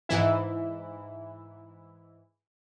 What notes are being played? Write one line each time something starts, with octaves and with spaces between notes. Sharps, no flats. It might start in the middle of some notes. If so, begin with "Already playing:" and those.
G#2 E3 E4